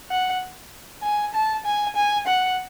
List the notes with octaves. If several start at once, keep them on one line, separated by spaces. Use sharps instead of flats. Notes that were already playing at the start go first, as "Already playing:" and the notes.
F#5
G#5
A5
G#5
G#5
F#5